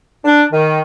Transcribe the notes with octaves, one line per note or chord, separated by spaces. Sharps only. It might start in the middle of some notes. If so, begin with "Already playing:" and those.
D4
D#3